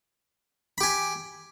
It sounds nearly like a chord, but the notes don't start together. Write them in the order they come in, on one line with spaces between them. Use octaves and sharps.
B5 G4 G#5